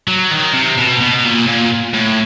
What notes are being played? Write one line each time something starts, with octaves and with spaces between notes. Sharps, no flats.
F#3
D#3
C3
B2
B2
A#2
A#2
A2